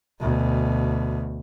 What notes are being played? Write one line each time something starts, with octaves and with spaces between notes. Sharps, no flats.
D2 B2